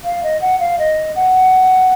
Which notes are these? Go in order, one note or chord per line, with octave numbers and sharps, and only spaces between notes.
F5
D#5
F#5
F5
D#5
F#5